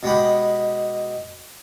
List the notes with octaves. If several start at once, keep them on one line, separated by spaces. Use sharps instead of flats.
B2 G#3 G4 B5